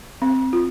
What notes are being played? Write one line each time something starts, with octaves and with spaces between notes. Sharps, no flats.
C4
F4